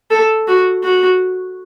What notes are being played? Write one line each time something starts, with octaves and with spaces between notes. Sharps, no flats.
A4
F#4
F#4